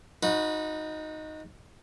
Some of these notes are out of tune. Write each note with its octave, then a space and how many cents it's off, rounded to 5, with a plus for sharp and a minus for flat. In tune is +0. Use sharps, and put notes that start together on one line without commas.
D#4 +0 F#4 -30 B4 -10